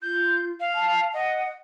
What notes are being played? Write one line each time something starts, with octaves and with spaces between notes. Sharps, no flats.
F4 G6
F5
A5
D#5 F#5